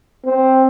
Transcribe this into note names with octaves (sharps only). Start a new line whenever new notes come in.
C4